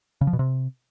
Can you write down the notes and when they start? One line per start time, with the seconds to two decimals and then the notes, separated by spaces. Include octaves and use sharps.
0.21 C#3
0.27 F3
0.33 B2
0.39 C3